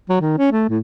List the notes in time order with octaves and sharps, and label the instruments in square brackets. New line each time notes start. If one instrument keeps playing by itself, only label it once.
[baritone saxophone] F#3
D#3
C#4
A3
A2